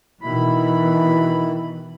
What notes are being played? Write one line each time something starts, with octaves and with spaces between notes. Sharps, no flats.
B2 D#3 E3 E4 B5